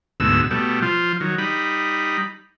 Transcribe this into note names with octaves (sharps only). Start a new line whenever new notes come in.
D2 G#2 B2 E6
B2 G3 A3
F3 F4
D#3 F#3
G3 D#4 B5